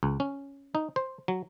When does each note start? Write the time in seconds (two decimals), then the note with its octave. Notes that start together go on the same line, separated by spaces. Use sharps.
0.03 C#2
0.20 C#4
0.75 D#4
0.96 C5
1.28 F#3